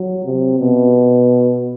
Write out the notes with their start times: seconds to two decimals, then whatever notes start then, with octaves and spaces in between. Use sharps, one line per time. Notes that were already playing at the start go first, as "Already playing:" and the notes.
Already playing: F#3
0.25 C3
0.60 B2